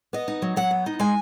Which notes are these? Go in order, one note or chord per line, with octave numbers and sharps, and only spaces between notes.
B3 D#5
D#4
F#3
F#3 F#5
B3
D#4
G#3 G#5